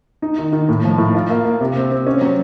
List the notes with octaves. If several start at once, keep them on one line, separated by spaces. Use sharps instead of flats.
D#4
D#3
D#3
A2
F3
A2
F4
A#3
A#3
C3
C4
C4
C#4
F#3